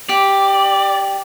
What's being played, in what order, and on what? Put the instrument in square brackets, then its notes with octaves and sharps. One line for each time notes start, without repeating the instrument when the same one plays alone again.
[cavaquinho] G4 [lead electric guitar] D5